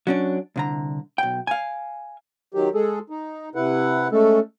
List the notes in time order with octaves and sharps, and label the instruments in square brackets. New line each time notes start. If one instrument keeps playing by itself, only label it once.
[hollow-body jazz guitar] F#3 C#4 D4
C2 D3 A#5
B1 G5
F5 G#5
[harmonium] D#3 F#3 G4
G#3 G#4 A4
D#4
C3 E4 B4 F#5
G#3 A3 C#4 A4